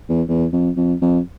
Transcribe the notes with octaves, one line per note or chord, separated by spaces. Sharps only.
E2
E2
F2
F2
F2